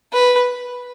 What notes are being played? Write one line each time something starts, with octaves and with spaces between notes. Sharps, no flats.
B4